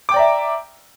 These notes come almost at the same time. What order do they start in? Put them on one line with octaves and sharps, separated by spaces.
D6 G5 D5 A#5 E5